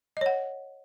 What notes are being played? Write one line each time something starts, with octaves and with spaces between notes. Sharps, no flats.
C#5 D#5 F#5